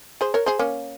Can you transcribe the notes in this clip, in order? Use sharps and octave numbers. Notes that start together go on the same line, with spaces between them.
G#4 C5
A#4 C#5
G#4 C5
A#3 C#4